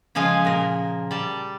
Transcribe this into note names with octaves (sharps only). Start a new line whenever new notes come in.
C#3 F3 G#3 F5 G#5
A#2 A#4
G3 A5